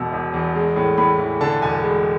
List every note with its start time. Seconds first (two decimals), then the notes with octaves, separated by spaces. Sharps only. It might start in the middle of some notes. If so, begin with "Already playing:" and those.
Already playing: E1 B2 E6
0.12 E1
0.33 E2
0.55 G#3
0.76 A2
0.98 A2 B5
1.19 E3
1.41 D3 A5
1.62 E1 G#5
1.83 G#3